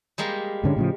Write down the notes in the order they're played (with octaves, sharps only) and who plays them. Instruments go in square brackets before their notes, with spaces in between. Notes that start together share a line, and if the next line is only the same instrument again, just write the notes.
[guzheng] G3 G#3 A#3
[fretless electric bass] G#2 D3 C#4
A2 C#3 F3